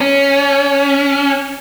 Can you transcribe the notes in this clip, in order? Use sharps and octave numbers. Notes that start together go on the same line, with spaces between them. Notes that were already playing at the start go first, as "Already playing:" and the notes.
C#4